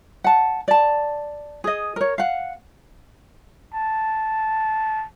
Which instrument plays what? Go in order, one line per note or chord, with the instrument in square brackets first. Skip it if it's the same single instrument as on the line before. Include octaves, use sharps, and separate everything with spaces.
[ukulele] F#5 A5
D5 A5
G#4 D#5
A#4 C#5
F5 F#5
[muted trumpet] A5